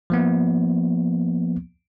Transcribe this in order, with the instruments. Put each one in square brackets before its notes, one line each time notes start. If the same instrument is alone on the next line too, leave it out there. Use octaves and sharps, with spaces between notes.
[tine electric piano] F3 A#3 B3